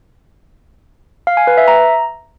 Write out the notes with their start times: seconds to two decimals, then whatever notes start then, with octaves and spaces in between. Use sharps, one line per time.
1.27 F5
1.37 G#5
1.47 B4
1.58 E5
1.68 A#5